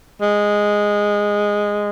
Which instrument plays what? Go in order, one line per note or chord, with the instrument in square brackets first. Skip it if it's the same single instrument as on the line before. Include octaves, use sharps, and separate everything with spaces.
[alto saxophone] G#3